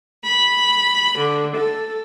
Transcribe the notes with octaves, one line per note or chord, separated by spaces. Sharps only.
B5
D3
A4